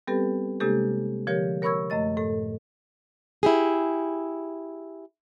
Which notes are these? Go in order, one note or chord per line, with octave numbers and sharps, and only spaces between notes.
G3 B3 C4 G4 A4 B4
C3 G#3 A#3 D4 G4 A4
D3 F3 G4 A#4 C#5
A#4 C#5 B5 C#6 E6 G#6
F#2 A3 D#5 A6
A2 A4
E4 G4 G#4